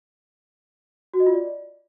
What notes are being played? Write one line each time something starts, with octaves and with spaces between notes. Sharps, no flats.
F#4
D#5
F4
D5